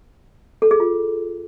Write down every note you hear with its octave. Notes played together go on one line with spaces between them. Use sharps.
A4
G#4
F4